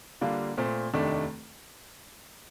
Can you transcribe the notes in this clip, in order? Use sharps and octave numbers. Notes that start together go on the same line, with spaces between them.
D3 G3 A#3 D4 F4
A#2 A3 C4
F1 D#2 D#3 A3 D4